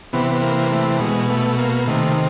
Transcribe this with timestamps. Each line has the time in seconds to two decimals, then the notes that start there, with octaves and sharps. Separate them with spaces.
0.13 C3 E3 B3
0.31 B3
0.42 A#3
0.71 A3
1.00 B2 G#3
1.29 A3
1.58 A#3
1.87 C3 D#3 A3